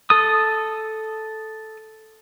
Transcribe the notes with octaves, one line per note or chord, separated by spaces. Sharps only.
A4 D#6